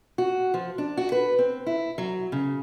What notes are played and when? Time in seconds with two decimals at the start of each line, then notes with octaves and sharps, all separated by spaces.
0.18 F#4
0.54 F3
0.78 D4
0.97 F#4
1.12 B4
1.39 C4
1.66 E4
1.98 F#3
2.32 C#3